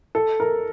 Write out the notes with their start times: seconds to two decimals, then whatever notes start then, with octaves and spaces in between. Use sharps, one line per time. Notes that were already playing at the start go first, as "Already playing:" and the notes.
0.15 A4
0.40 A#4